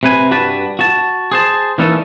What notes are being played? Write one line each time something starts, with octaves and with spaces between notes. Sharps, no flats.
C3 B4 G#5
G2 F#4 G4 B4 A5
F#4 A5
G#4 C5 A5
E3 G3 A#3 C#4 D#4 A4